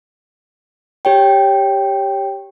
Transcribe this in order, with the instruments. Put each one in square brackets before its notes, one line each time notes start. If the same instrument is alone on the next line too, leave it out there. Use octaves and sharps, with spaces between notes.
[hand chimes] G4 C#5 G5